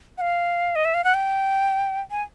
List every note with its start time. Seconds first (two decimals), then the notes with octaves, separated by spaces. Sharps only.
0.18 F#5
0.21 F5
0.76 D#5
0.85 E5
0.94 F5
1.04 F#5
1.14 G5
2.11 G#5